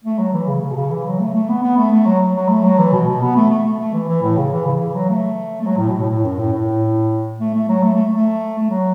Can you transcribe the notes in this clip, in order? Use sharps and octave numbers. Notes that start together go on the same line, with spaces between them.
A3
F#3
E3
C#3
C#3
B2
C#3
E3
F#3
A3
A3
B3
B3
A3
A3
F#3
F#3
A3
F#3
E3
B2
B2
B3
A3
A3
A3
A3
E3
E3
A2
C#3
E3
C#3
E3
F#3
A3
A3
F#3
A2
B2
A2
A2
F#2
A2
A2
A3
A3
F#3
A3
A3
A3
A3
F#3